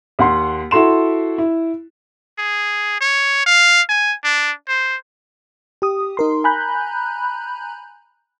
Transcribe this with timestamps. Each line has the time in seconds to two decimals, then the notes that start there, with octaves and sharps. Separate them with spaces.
0.19 D#2 F#5 C6
0.71 E4 F#4 A4 C6 E7
1.38 E4
2.39 G#4
3.01 C#5
3.46 F5
3.89 G#5
4.24 D4
4.68 C5
5.82 G4 D#6
6.17 D#4 A#4 C6
6.44 G#5 A#5 B5 F#6 G6